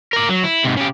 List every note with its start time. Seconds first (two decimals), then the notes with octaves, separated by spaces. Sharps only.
0.13 A#4 D5
0.29 F#3
0.44 E4
0.65 G#2 C3
0.77 C#3 G4